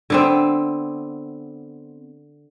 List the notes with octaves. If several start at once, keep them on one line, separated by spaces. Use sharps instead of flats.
D3 B3 C4